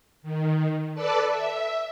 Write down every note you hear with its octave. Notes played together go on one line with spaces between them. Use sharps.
D#3
A4 B4 D5 A5 D6 E6
E5